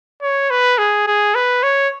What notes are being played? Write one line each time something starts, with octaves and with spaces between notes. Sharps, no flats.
C#5
B4
G#4
G#4
B4
C#5